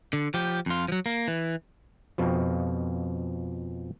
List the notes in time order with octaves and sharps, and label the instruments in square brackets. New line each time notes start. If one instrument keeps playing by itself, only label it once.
[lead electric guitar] D3
F3 G4
F2 F4
F3 F#3
A#3
E3
[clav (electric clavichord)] F2 B2 F3